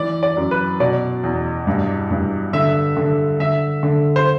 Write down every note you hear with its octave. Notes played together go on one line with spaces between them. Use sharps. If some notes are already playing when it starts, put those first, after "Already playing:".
Already playing: E3 D5
D5
F#2
B4
B2 D5
E2
G2
G2
D3 E5
D3
D3 E5
D3
C5